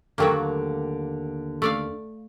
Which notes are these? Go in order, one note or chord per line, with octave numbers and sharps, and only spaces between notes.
D#2 D3 F#3 A3 A#3 G5
A3 D5 F5